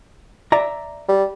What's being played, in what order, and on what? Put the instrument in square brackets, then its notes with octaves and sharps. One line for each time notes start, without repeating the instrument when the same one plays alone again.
[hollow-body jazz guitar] D5 E5 A#5
[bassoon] G3